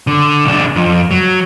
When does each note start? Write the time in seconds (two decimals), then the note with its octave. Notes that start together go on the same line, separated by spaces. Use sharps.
0.07 D3
0.45 B1 D4
0.76 F2
1.11 F#3